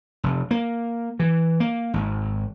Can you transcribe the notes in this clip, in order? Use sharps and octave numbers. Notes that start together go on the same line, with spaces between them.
F1
A#3
E3
A#3
G#1